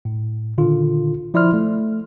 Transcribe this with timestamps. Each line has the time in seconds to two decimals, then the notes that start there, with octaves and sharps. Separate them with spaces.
0.05 A2
0.58 A#2 D3 D#3 F4
1.34 F3 E4 D5 C6 F6
1.54 A3